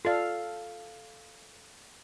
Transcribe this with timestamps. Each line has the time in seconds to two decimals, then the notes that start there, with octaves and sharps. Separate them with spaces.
0.05 F4 A4 D5 F5